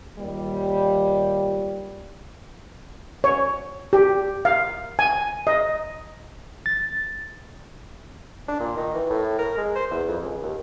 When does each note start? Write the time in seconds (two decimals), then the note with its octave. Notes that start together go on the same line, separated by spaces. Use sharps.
0.19 D#2 A#2 G3
3.24 C#5
3.93 G4
4.45 F5
4.99 G#5
5.47 D#5
6.66 A6
8.48 D4
8.60 A#2
8.77 D#3
8.94 E3
9.10 A2
9.39 A#4
9.57 G#3
9.76 C5
9.91 E2
10.08 F2
10.23 C#2
10.42 D#2